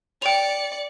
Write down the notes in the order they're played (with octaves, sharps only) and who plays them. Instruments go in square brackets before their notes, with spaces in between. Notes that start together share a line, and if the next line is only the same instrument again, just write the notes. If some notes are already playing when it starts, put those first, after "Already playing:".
[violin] D5 C#7 [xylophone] G5 F7